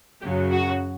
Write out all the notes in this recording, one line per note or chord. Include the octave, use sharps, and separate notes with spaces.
F#2 C#3 F#3 G4
F#4